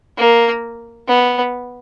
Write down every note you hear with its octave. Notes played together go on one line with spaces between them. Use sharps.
A#3
B3